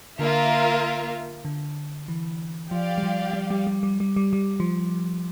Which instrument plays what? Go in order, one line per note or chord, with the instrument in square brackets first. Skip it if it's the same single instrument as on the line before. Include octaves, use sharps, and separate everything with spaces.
[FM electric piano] D3 [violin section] A#3 F4 A#4 E5
[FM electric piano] D3
E3
[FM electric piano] F3 [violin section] G4 D5 F5
[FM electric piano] G3
F3
G3
G3
G3
G3
G3
G3
G3
F3